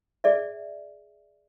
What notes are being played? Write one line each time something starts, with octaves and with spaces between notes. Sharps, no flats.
G#4 D5 E5